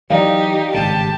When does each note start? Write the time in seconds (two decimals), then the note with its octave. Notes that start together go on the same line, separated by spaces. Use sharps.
0.10 E3 F#3 D#4 G4 D5 F5
0.74 G#1 G2 C#3 G4 A5